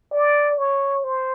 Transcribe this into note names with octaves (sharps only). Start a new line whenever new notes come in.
D5
C#5
C5